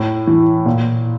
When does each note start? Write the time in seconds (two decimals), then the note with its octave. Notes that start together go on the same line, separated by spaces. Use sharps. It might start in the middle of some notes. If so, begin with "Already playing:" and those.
Already playing: A2
0.27 E3
0.66 A#2